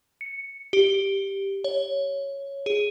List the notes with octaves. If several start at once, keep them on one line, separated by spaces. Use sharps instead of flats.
C#7
G4
C#5
G#4